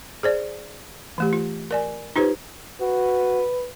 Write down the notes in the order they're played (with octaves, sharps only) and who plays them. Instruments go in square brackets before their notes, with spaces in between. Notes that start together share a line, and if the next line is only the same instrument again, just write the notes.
[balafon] G#4 C5 D5
E3 A3 G4
F4
A#4 D5 G#5
D#4 F4 G4 B4 C5
[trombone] F#4 [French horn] B4